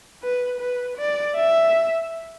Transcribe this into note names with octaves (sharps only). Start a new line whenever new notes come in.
B4
B4
D5
E5